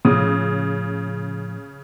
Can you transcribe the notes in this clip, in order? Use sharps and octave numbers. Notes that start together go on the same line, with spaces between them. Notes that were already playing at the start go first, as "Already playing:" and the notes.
A2 C#3 F3 D#6